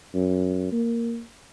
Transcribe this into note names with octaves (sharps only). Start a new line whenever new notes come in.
F#2
A#3